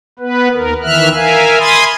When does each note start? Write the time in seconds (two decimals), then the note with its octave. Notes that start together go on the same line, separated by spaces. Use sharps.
0.19 B3 B4
0.53 D#2 A#4
0.83 D#3 E3 E5 F6 F#6
1.14 A#4 E5 F5 G#5
1.59 G#5 B5 C6 D#6 G#6 A6